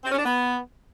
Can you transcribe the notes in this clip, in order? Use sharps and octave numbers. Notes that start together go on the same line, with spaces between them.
C4
C#4
D4
B3